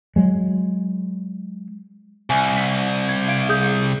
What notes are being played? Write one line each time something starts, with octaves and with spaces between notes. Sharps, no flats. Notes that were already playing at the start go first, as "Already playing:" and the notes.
F#3 G#3
C2 G#5
B6
G#6
F5 G#6 D7
G#4 D#6 G6